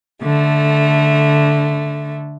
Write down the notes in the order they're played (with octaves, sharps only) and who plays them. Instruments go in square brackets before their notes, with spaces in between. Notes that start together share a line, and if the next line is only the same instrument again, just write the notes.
[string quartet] D3 A3